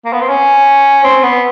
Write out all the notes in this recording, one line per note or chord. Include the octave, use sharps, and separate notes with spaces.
A#3
B3
C4
C#4
C4
B3